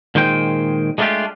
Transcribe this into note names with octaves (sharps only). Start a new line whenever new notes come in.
A#2 D#3 G#3 C5 G5
G#3 A3 B3 D4 F4 G4